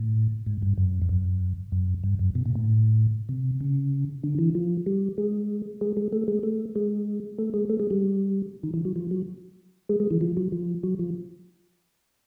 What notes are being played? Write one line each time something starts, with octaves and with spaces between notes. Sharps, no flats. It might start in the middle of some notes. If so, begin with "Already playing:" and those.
Already playing: A2
G#2
G2
F#2
F2
F#2
F#2
G2
F#2
B2
A#2
A2
C3
C#3
D3
E3
F3
G3
G#3
G#3
G#3
A3
G#3
A3
G#3
A3
G#3
A3
G#3
G3
D#3
E3
F#3
F3
F#3
G#3
G#3
E3
F3
F#3
F3
F#3
F3